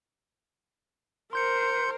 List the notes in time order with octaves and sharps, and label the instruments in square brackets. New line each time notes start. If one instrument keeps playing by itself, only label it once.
[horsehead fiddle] A#4 C5 [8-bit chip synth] C6 G6 C#7